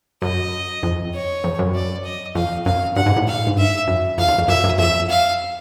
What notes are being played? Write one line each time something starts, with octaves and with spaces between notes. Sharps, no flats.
F#2 D#5
F2
C#5
F2
F#2
D5
D#5
F2 F5
F#2 F5
G2 F#5
G#2
A2
F5
G#2
G2 E5
F#2
F2 F5
E2
F2
F#2 E5
F#2
F2 E5
F5